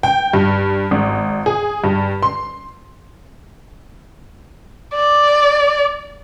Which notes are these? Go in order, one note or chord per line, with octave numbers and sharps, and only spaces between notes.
G5
G2
G#1
G#4
G2
C6
D5